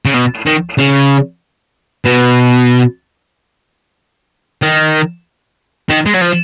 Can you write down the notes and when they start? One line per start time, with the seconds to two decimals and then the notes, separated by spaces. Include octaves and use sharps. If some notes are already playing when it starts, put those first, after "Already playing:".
0.06 C#3
0.14 B2
0.46 D#3
0.78 C#3
2.05 B2
4.62 D#3
5.89 D#3
6.06 G#3
6.14 F#3
6.21 F3